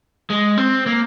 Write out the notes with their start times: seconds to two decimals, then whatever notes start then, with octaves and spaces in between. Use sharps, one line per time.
0.30 G#3
0.57 C4
0.86 A#3